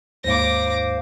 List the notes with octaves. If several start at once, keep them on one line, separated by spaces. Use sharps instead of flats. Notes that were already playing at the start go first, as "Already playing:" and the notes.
D#2 G#2 C5 F5 D6 A#6